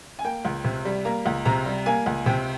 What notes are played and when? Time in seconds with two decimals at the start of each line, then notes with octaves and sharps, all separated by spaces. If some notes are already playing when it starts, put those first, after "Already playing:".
0.19 G#5
0.24 A#3 G5
0.45 C#2
0.64 C3
0.85 G3
1.05 A#3 A#5
1.26 C#2
1.45 C3 A#5
1.66 G3
1.86 A#3 G#5
2.06 C#2
2.26 C3 G5